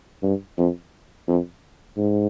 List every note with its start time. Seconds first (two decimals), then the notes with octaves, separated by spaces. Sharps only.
0.23 G2
0.58 F2
1.27 F2
1.97 G#2